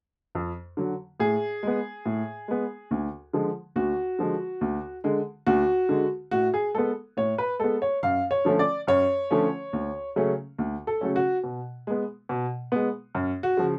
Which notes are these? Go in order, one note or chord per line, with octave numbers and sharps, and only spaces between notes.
F2
D3 F#3
A2 G#4
G#3 B3
A2
G#3 B3
D2
D3 F3 G#3
D2 F#4
D3 F3 G#3
D2
D3 G#3
D2 F#4
D3 G#3
A2 F#4
G#4
G#3 B3 A4
A2 C#5
B4
G#3 B3 A4
C#5
F#2 F5
C#5
D3 F3 A3 C#4
D5
F#2 C#5
D3 F3 A3 C#4
D2
C#3 F#3 A3 C#4
D2
A4
C#3 F#3 A3 C#4
F#4
B2
G#3 B3
B2
G#3 B3
F#2
F#4
C#3 F3